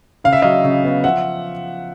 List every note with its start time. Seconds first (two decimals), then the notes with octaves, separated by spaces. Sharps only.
0.24 C#3 F5
0.33 E5
0.42 F#3 D#5 F5
0.64 C#3
0.84 B3
1.04 F3 E5 F#5